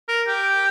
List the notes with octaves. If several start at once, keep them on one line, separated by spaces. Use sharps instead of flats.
A#4
G4